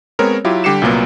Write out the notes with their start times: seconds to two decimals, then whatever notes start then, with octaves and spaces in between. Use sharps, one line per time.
0.19 G#3 B3 C4 A#4 C#5
0.44 F#3 E4 F4 G4
0.64 D3 G3 G4 C7 C#7 E7
0.82 C2 A#2 F#3 A#3 B3